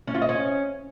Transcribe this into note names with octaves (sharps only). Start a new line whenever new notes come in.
C#4
F4
D#5
C#4